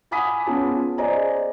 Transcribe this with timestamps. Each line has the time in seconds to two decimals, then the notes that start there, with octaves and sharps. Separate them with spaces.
0.11 F#5 G#5 B5 D6 D#6 B6
0.47 B3 C#4 F4 G#4 G#5 A5
0.98 G#4 C5 D5 D#5 G#5 A#5